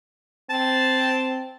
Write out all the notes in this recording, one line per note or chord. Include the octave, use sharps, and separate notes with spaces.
C4 A5